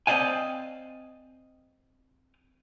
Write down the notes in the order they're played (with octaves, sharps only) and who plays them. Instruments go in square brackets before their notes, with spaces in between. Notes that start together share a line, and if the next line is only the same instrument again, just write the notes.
[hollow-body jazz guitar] C4 C5 D5 D#5 F5 G#5